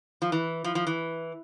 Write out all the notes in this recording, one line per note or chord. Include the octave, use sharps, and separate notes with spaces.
F3
E3
F3
F3
E3